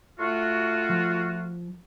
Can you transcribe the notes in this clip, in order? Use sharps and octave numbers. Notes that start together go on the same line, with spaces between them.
A3 F4 F#4
F3